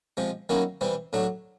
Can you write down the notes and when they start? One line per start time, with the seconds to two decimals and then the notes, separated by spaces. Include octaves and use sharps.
0.17 C3 F3 G#3
0.49 D#3 F#3 A#3 C#4 E4
0.81 C3 E3 G3 C4
1.13 A2 F#3 A3 D4